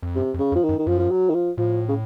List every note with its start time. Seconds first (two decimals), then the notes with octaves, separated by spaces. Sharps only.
0.03 F2
0.15 F#2 C3
0.34 F2
0.39 C#3
0.52 F2
0.55 F3
0.64 D#3
0.69 F#2
0.79 D#3
0.87 F#2 F3
0.98 F3
1.11 F#3
1.29 D#3
1.34 F3
1.58 A2 F3
1.89 C#3